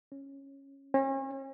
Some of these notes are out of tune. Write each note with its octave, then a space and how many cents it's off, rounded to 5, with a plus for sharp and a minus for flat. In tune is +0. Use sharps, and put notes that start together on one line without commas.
C#4 -10
C#4 -40